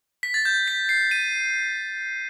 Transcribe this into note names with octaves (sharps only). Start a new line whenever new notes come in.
B6
A6
G6
B6
C7
D#7